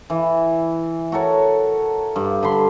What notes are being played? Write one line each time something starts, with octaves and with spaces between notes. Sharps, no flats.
E3
F#4 A4 A#4 C#5
G2
D3 B5 C6